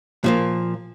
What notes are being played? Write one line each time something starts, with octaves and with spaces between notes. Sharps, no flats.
A#2 F3 A#3